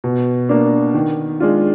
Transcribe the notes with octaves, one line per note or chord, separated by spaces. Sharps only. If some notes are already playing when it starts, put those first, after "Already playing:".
B2
A#3 D4
D#3
G#3 D4 F4